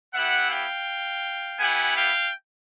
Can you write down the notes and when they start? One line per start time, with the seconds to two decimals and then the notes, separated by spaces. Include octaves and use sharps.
0.13 B3 E4 G4 E5 F#5
0.50 F5 G5
1.58 B3 E4 G4 F#5 G#5
1.95 F5 G5